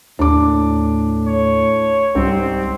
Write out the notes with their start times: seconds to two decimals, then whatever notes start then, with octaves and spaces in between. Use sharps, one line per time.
0.19 D#2 A2 D4 D6
1.27 C#5
2.15 C2 G#2 G3 C4